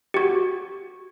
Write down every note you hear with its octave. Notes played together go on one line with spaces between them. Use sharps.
F#4 G4